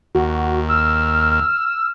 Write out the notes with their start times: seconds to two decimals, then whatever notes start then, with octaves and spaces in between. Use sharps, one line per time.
0.15 D#2 F#4
0.69 E6 F6